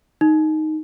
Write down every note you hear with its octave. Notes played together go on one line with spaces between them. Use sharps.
D#4